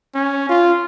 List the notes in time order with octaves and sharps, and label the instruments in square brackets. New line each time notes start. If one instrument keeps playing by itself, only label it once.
[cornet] C#4
F4